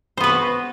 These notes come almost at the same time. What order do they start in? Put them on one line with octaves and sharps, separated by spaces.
C5 B3 B4 F#4